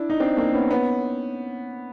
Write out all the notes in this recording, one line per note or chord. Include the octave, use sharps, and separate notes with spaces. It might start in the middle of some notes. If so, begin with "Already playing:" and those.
Already playing: D4 E4
D#4
C4 D4
A#3 C4
B3 C#4
B3 C#4